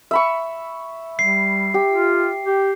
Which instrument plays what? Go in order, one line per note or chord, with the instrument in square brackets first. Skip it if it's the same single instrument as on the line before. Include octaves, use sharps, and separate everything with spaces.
[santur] E5 B5 C#6
[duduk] G3 [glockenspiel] C7
[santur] G4
[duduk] F4
G4